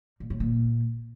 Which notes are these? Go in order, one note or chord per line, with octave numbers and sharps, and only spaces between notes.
A#2
A2
A#2